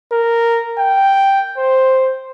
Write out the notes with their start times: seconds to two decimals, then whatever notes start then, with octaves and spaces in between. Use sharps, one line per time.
0.12 A#4
0.78 G5
1.58 C5